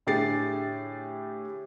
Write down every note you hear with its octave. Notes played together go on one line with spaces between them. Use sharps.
A2 D3 G4 G#4 A6 C7